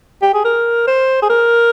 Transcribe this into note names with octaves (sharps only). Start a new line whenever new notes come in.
G4
G#4
A#4
C5
G#4
A#4